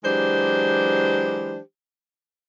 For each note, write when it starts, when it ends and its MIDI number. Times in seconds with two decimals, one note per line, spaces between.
0.04 1.59 52
0.04 1.59 54
0.04 1.59 56
0.04 1.59 62
0.04 1.59 67
0.04 1.59 72